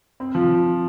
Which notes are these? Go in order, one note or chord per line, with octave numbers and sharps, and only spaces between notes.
C4
F3